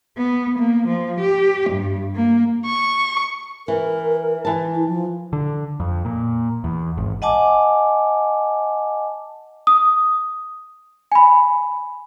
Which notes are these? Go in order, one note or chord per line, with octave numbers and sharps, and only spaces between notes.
B3
A#3
F3
G4
G2
A#3
C#6
E3 A#4
E3 A5
E4
F3
D3
F2
A#2
E2
G#1
D#5 F#5 G#5 A5 D6
D#6
G#5 B5